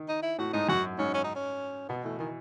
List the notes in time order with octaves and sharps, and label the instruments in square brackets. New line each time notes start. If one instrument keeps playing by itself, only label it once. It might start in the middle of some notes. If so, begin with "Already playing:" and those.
Already playing: [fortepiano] D#3
[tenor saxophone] D#4
E4
[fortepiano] A2 [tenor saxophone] F#4
[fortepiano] G#2 [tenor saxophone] D#4
[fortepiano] F#2 [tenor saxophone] F#4
[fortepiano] G#2 [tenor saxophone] C#4
[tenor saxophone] C#4
D#4
C#4
[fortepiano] B2 [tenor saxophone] B3
[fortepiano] E3 [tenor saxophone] A3
[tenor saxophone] D#3 [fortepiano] E3